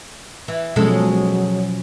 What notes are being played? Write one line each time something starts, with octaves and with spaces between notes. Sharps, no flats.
E3
B2 F3 F#3 G#3 C#4 A4